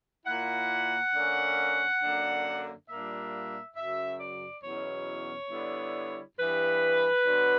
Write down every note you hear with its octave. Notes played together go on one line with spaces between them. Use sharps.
A#2 A#3 E4 F#5
D3 A#3 C#4
F#2 D3 A#3 D4
A#2 G3 A#3 D4 E5
F#2 C#3 F#3 E5
D5
E2 B2 F#3 C#4 E4 C#5
D3 G3 B3 E4
G2 E3 B3 B4
D3 F#3 B3 D4